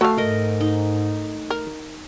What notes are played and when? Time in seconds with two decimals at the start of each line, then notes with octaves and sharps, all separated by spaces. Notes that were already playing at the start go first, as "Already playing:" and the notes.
0.01 A3 F#4 F5
0.17 G#2 A#4 D#5
0.61 D#4
1.50 A#4